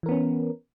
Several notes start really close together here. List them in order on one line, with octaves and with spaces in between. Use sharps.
E3 A#4 B3 C#4